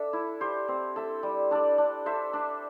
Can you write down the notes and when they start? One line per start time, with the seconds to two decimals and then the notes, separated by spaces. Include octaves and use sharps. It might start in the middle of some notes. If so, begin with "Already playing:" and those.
Already playing: D4 A4 E5
0.13 E4
0.41 G4 C5
0.68 C4
0.96 A4 E5
1.23 G3
1.51 D4 A4 D5
1.78 D4
2.06 A4 C5 E5
2.33 D4